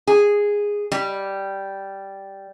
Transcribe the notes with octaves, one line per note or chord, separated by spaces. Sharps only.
G#4
G3